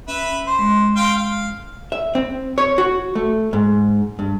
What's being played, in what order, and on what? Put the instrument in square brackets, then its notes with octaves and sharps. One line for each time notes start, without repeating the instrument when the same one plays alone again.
[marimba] C#4 [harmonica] B4 E5
[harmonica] C5
[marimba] G#3
[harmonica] F5 G5 C6
F5
[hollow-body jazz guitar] E5
C4
C#5
F#4
A3
G#2
G2